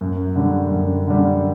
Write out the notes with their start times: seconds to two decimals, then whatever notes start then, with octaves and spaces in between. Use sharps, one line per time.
0.01 F#2
0.36 D3 G3
0.72 F#2
1.07 D3 G3